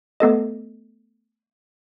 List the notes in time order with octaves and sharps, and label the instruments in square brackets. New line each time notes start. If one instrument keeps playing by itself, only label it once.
[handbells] A3 B3 A4 D#5